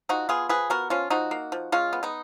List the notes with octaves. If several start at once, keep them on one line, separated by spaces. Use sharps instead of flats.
F3 D#4 F#4
B3 F4 G#4
F3 G#4 B4
B3 F#4 A#4
F3 C#4 F4
F3 D#4 F#4
A#3
F3
G#3 C#4 F4
B3
B3 D#4